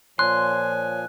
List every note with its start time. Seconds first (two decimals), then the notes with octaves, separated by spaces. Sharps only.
0.19 A#2 F3 C#5 G#5 C6 F#6